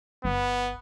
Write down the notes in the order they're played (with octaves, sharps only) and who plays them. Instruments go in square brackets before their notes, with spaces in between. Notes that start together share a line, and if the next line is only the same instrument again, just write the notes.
[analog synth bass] G1 [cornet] B3